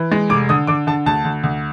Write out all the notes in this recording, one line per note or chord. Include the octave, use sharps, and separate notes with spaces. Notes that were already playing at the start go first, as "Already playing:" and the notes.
Already playing: E3
G#3
F1 D6
D3 D#6
D3 D6
D3 A5
D2 A5
D2
D2